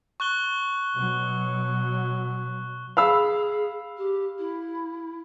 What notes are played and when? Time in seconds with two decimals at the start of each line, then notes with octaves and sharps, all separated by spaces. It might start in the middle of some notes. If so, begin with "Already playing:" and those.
0.20 C#6 F#6 G7
0.95 B2 F#3
2.97 G#4 F5 B5 E6
3.97 G4
4.38 E4